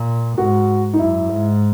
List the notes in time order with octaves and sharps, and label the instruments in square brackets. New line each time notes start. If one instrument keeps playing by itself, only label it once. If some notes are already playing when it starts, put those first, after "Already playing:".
Already playing: [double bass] A#2
[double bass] G#2 [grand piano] F#4
[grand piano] D#4
[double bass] F#2 [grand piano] E4
[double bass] G#2